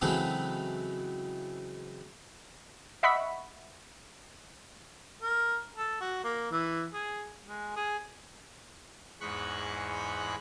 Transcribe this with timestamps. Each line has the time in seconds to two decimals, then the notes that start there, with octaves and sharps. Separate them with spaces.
0.02 C#3 E3 F#3 G#3 A3 C4
3.03 D#5 E5 F#5 B5 C#6 B6
5.22 A#4
5.76 A4
6.00 F#4
6.24 A#3
6.51 E3
6.93 G#4
7.45 G#3
7.76 G#4
9.20 E2 G#2 G#3 B5 C#6 F#6